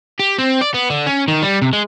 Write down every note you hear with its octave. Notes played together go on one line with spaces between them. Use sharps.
G4
C4
D5
B3
D3
C#4
D#3
G3
C3
G#3